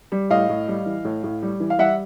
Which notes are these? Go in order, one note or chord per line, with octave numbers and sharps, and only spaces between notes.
G3
A2 D#5 F5
A2
G3
E3
A2
A2
G3
E3
F5
G3 E5 F#5